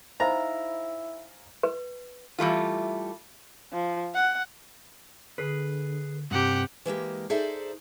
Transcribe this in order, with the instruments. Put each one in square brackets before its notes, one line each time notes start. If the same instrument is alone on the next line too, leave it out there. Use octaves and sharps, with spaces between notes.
[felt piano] D#4 F5 G#5 [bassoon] E4 [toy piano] C5 D#5 B5 [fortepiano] A#5
[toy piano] B4
[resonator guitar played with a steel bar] E3 G3 A3 F4
[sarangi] F3
F#5
[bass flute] D3 [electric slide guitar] G#4 B4
[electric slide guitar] G2 C3 [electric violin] G4 F#5
[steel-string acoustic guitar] E3 G#3 A#3 G4
D#4 G#4 A4 C5 D5 E5